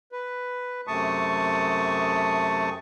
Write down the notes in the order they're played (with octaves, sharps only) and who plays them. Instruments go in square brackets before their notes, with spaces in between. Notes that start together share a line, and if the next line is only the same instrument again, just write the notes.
[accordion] B4
F#2 C3 A3 A5 C#6 D#6